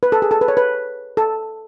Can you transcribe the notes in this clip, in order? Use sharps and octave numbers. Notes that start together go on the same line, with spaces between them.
B4
A4
G#4
A4
B4
C#5
B4
A4